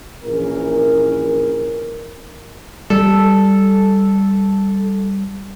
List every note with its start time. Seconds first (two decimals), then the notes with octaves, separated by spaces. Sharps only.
0.24 A#1 E3 C#4 A#4
2.90 G3 A4